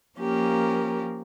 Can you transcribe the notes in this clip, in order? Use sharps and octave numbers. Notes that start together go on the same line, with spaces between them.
F3 A#3 C#4 G4 A#4